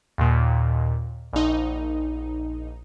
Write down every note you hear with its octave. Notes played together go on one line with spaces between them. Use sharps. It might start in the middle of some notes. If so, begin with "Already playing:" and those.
D#2 A#2
A#1 D#4